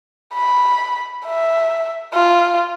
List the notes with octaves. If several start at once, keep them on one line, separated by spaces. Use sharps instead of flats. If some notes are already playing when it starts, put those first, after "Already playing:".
B5
E5
F4